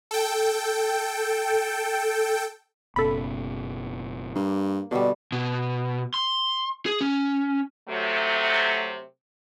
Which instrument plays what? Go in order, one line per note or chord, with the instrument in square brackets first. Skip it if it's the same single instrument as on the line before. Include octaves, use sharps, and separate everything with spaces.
[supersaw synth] A4 G5
[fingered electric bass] F#1 B2 C#4 [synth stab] A4 B5
[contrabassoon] G2 [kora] A#3
[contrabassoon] B2 [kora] D3 G3
[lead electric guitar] B2
C6
G#4
C#4
[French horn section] C3 F#3 A3